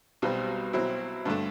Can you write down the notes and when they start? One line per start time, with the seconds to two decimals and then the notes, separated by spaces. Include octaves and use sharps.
0.22 B1 B2 G3 C4
0.73 B2 F#3 C4 E4
1.25 G2 D3 A3